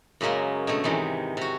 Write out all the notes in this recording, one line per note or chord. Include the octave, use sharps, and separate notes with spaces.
F#2 C#3 F#3 G#3 A#3
B2 D3 A3
G#2 C3 D#3 E3
C3 F#4